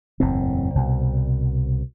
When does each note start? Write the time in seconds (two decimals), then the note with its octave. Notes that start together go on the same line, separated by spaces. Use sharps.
0.20 F#1 E2 A2 C4
0.75 C2 B2